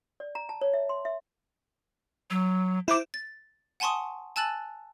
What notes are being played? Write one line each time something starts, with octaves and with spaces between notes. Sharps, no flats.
D5
A#5
A5
C#5
E5
C6
E5
F#3
E4 C5 D6
A6
F#5 G#5 A5 C6 C#6 D#6
G#5 A5 E6 F#6 A6 F#7